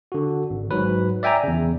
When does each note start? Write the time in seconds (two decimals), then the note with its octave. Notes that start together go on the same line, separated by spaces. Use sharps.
0.12 D3 F#4
0.50 G#1
0.71 G#2 F#3 B4
1.23 D5 E5 G5 G#5 A#5
1.44 E2 C#3